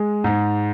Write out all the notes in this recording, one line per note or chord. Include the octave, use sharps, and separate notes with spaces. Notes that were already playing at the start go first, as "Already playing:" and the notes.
Already playing: G#3
G#2